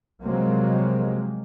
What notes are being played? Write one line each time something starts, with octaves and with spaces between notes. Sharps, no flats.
C3 F3 F#3 G#3 A#3 C4